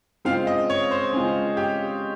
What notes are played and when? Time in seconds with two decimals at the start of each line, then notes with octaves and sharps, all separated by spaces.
0.25 C#3 G#3 C4 F4 F5
0.47 D#5
0.70 C#5
0.91 C5
1.13 C#3 G#3 C4 F4 G#4
1.57 G4